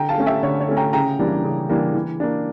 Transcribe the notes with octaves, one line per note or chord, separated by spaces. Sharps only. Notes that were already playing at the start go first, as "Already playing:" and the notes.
Already playing: D3 G5 A#5
F5 A5
A3 C#4
E5 G5
D3 C#5
C#5
A3 C#4
G5 A#5
C#3 G5 A#5
E3 G3 A#3 D4
C#3
E3 G3 A#3 D4
E3
A#3 D4